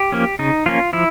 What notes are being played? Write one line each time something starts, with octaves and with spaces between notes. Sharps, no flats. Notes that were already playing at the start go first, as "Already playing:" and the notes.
Already playing: G4
F3 A#3 C#4
C#3 D#4
F3 A#3 C#4 F4
F3 E4